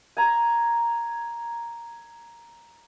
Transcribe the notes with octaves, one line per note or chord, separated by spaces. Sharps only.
G#5 A#5